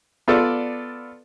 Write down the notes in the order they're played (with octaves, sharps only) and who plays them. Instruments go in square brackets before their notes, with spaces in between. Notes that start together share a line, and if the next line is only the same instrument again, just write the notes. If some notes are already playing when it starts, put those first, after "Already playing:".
[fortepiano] B3 F4 A4 D5